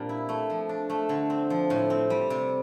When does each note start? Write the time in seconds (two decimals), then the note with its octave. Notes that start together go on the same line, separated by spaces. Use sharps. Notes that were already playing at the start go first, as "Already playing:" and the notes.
Already playing: A#2 G3 C4 D4
0.09 E4
0.29 A3
0.50 F3
0.69 D4
0.90 A3
1.09 D3
1.30 C4
1.50 F3
1.70 A2
1.90 C4
2.10 G3
2.30 C3